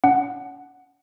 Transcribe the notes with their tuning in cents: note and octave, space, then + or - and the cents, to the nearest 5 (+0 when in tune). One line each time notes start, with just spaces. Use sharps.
C#4 +35 F#5 +0